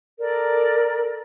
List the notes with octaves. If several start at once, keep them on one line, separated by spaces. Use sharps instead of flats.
A4 A#4 D5